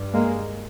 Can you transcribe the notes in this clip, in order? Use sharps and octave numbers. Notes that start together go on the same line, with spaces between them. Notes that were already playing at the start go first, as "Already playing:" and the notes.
Already playing: G2
G#3 A#3